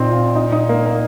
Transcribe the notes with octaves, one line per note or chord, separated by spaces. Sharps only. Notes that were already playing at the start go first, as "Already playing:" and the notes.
Already playing: A#2 C4 D#4
F4
D#4
D#4
A#3
A#3